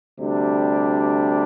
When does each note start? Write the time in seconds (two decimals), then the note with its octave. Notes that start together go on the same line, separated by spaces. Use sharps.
0.20 D2 C3 G3 D4